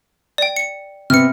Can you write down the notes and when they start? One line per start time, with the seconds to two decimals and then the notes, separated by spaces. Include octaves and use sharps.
0.38 D5 G5
0.56 C#7
1.10 C3 B3 F6 C#7